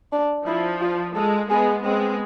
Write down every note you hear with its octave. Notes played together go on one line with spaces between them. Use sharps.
D4
F3 E4
F4
G#3 A4
G#3 B3 G#4
G#3 B3 C4